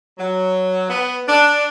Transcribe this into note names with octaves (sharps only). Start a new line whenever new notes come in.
F#3
B3
D4